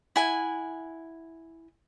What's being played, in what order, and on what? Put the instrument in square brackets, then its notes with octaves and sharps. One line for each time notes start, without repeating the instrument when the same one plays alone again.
[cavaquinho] E4 F#5 G#5